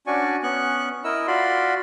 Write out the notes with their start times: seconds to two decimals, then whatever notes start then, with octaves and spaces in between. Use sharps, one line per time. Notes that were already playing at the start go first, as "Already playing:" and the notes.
0.07 C#4 D4 F#4 D5 G#5 C#6
0.43 B3 C#4 C#6 F#6
1.04 E4 A#4 D#5 E6
1.27 F4 F#4 D5 B5 C6